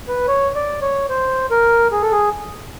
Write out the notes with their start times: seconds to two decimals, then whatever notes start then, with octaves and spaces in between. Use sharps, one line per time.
0.08 B4
0.28 C#5
0.55 D5
0.82 C#5
1.10 C5
1.51 A#4
1.92 G#4
2.02 A4
2.12 G#4